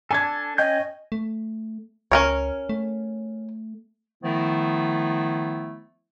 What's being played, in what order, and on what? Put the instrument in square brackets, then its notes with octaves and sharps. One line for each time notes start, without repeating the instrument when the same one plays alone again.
[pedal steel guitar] D4 A4 [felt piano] G#5 G#6
[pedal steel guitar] C#4 G5 G6 [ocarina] D#5
[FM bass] A3
[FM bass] C#2 [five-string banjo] C#4 A#4 C#5
[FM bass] A3
[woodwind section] D#3 F3 A3 B3 E4